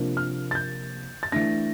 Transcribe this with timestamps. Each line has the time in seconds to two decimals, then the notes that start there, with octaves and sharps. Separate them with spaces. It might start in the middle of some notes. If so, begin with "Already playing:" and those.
Already playing: C3 F3 A#3 D4
0.17 F6
0.51 A6
0.55 G6
1.23 A6
1.32 E3 A3 D4 A#6